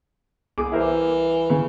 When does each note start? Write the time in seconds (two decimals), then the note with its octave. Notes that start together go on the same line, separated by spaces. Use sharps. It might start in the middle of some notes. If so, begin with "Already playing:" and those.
0.58 C2 G#4 D6
0.72 E3 E4 A#4 C5
1.50 C#3